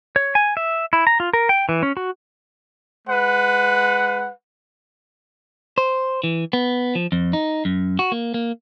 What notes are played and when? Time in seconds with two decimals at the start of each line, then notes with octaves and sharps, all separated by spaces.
0.16 C#5
0.35 G#5
0.57 E5
0.93 E4
1.07 A#5
1.20 F4
1.33 A#4
1.49 G5
1.69 E3
1.83 C#4
1.97 F#4
3.08 G#3 B4 F#5
5.78 C5
6.24 E3
6.53 B3
6.95 F3
7.12 F2
7.33 D#4
7.65 F#2
7.99 F#4
8.12 A#3
8.34 A#3